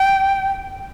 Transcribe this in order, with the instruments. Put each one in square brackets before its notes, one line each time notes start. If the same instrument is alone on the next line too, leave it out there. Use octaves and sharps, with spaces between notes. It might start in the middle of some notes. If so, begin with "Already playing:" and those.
Already playing: [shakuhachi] G5